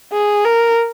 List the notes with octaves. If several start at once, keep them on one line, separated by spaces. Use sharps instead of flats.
G#4
A#4